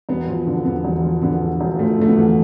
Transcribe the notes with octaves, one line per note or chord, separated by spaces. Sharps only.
E1 B3
F3
D3
E2 B3
E1
F3
D3 B3
E2
E1
F3 A3
D3 A3
B3
E2